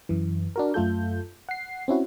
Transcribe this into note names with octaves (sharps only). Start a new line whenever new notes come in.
F#2 E3
D4 F#4 A#4
F#2 A3 F4 A4 G6
F#5 C7
C4 C#4 E4 F#4